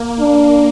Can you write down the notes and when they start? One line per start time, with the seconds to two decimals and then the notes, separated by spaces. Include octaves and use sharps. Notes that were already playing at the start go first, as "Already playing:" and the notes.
Already playing: A#3
0.19 D4